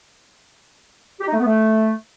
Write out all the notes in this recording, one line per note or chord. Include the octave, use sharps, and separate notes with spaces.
G4
D#4
A3
B3
A3